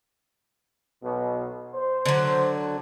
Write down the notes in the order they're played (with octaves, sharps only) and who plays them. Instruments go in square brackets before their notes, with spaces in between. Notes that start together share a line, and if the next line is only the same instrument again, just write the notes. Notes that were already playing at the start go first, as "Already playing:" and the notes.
[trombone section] B1 B2
C5
[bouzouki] D3 F#3